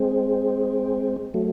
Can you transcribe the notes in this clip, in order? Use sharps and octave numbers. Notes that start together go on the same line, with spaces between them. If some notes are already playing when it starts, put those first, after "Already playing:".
Already playing: G#3 C4
F#3 A3